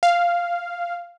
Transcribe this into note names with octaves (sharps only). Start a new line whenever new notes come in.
F5